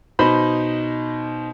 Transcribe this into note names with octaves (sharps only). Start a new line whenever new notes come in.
B2 D#4 C5 B5